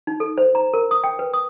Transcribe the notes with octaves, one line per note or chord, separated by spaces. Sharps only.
D#4
A4
C5
A#5
A#4
D#6
G5
B4
D#6